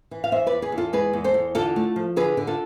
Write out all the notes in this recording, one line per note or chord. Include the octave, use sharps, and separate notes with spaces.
E3
F5
E2 C5 E5
B4 D5
E2
G#4 B4
E2
F4 A4
G#3 G#4 B4
E2
A4 C5
E2
D3 F4 A4
A3
F3
D3 G#4 B4
D3
F4 A4